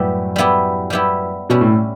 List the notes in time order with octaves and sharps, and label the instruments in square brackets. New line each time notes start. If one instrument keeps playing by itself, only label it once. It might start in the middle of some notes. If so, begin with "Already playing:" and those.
Already playing: [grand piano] F#2 A2 [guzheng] G3 B3 E4 G4
[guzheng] G3 B3 E4 G4
G3 B3 E4 G4
[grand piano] B2 [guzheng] G3 C#4 E4
[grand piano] A2